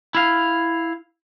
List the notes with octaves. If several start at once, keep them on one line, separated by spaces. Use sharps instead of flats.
E4 F5